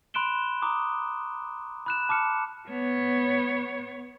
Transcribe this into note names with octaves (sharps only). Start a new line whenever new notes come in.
B5 C6 F#6 D7 E7 G7
A#5 D6 D#6
B5 F#6 E7
A5 D6 F6 C#7
B3 C#5